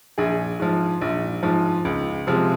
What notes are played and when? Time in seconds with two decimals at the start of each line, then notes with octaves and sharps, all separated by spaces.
0.18 A#1 G#4
0.59 G#2 F3
1.01 A#1
1.43 G#2 F3
1.85 C#2
2.27 C3 F3 G#3